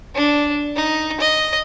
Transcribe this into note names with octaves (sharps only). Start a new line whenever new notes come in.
D4
D#4
D#5